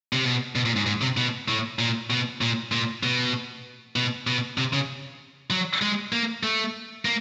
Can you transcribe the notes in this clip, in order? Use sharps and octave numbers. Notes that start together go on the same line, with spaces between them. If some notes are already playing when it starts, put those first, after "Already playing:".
C3
B2
B2
A#2
G#2
G#2
C3
B2
A2
A#2
B2
A#2
A#2
B2
B2
B2
C3
C#3
F#3
G#3
A#3
A3
A#3